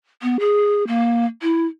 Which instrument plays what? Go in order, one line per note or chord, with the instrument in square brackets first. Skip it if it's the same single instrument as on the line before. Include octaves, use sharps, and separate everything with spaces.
[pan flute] B3
G#4
A#3
E4